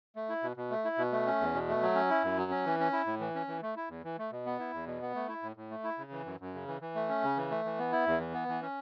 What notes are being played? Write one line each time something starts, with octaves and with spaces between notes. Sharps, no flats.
A3
E4
B2
B2
A3
E4
B2
A3
C#4
E2
B2
A3
F#3
C#4
E4
F#2
F#3
C#4
E3
C#4
E4
A2
E3
C#4
E3
A3
E4
E2
E3
A3
B2
B3
E4
E2
B2
B3
A3
E4
A2
A2
A3
E4
C#3
E3
F#2
F#2
C#3
E3
E3
A3
C#4
C#3
E3
A3
E3
B3
E4
E2
E3
B3
E3
C#4